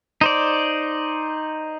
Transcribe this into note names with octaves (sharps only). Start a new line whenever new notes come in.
D#4 C5 D5